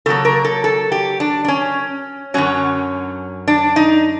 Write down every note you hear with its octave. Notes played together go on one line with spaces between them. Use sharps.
C#3 F#3 A#3 A4
A#4
A4
A4
G4
D4
D4
C#4
F#2 D3 F#3 C#4
D4
D#4